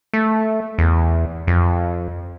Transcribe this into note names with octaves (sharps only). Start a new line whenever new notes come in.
A3
E2
F2